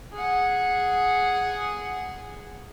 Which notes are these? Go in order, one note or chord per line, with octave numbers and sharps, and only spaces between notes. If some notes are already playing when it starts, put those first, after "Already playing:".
G#4 F#5